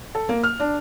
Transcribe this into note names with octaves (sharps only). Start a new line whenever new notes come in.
A4
A#3
F6
D4